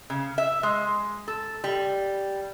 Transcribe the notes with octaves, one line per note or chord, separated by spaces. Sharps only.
C#3
E5
G#3
A4
G3